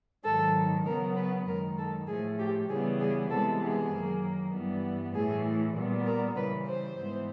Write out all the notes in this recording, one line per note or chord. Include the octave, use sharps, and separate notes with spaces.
G#2 D#3 F#3 A4
C#3 F#3 B3 A#4
B4
F#2 D#3 G#3 A#4
A4
A2 F3 A3 G#4
G4
C#3 E3 G3 B3 G#4
G#4
C3 E3 G#3 B3 A4
G#4
F#2 D#3 F#3 A#3
G2 E3 G3 B3
A2 E3 A3 G#4
A#2 G3 B3
A#4
C#3 E3 G3 B4
C5
G#2 E3 G#3 B3